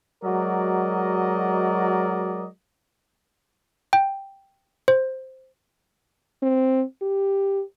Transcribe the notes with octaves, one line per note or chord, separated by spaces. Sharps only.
F#3 G#3 F#4 A#4 D5 D#5
G5
C5
C4
G4